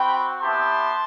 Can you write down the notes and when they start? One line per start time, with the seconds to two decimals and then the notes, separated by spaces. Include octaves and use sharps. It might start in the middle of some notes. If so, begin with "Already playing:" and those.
Already playing: C4 F#4 G5 B5
0.41 B3 E4 G4 A5 C6